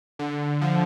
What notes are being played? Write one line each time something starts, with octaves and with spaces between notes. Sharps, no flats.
D3
F3